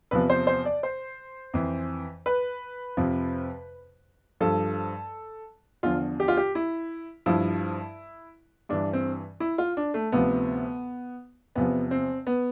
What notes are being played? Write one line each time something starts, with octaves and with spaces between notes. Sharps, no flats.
E2 C3 F3 B4
C5
C5
D5
C5
F2 E3
B4
F2 C3 F3
G2 F3 A4
E2 D3 F3 F4
G4
F4
G4
E4
G2 F3 E4
G2 E3 D4
C4
E4
F4
D4
A3
D2 C3 F3 B3
E2 C3 F3 B3
C4
B3